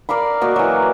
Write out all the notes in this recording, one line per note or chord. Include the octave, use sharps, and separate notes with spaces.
A#4 D5 F5 B5
A#3 F#4 D5 D#5
E3 F#3